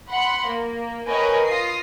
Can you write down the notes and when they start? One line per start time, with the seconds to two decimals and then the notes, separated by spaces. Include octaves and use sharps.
0.10 F#5 B5 C6
0.48 A#3
1.07 A#4 B4 C#5 D#5 G5 G#5
1.45 F4 D#6 A#6 C7